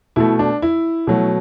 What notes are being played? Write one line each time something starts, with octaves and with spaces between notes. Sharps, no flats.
B2 A3 E4
D4
E4
B2 F#3 A3